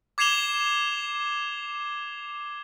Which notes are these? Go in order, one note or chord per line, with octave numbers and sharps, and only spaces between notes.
D6 G#6 C7 E7 F7 G7